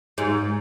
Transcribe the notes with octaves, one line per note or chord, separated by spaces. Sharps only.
G#2